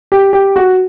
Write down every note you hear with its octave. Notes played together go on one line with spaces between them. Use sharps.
G4
G4
F#4